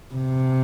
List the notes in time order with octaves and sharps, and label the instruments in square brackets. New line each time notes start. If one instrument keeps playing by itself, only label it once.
[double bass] C3